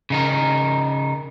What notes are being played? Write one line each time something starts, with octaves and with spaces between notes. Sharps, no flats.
C#3 D#4 A#4